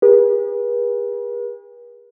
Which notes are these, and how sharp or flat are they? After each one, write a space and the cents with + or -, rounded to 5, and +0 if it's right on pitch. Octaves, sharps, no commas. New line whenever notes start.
G#4 -45 B4 -45